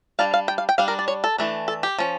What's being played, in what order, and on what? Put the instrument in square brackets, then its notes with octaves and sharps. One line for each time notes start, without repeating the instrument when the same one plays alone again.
[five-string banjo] G3 D4 F5
F5
G5
F5
G5
G3 D4 F5
A#4
D5
C#5
A4
E3 A3 D4
A4
G4
F3 C#4